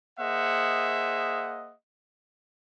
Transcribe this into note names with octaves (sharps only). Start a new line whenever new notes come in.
A#3 G#4 C5 D#5 E5 F#5